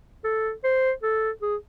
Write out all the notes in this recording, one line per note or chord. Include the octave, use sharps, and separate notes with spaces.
A4
C5
A4
G#4